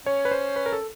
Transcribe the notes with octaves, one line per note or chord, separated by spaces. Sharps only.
C#4 C#5
B4
C5
B4
A#4
A4